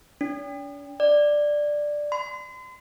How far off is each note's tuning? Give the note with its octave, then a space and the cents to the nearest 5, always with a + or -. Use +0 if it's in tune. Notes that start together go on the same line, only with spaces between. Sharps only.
D4 -45
D5 +5
C6 -40